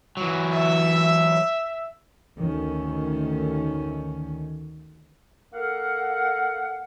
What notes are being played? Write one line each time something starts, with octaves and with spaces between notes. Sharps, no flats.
E3 F#3
E5
D2 D3 D#3 C#4
A#3 A4 A#4 F5 F#5